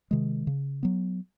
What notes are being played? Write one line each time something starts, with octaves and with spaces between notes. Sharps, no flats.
C3 D#3 G#3
C#3
F#3 B3